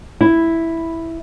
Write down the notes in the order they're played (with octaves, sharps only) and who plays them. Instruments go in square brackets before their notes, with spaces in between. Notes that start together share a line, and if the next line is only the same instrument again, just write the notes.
[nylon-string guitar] E4